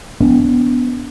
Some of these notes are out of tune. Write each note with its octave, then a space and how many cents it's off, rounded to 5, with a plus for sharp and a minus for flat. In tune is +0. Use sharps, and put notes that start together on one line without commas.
B3 +0 D4 -30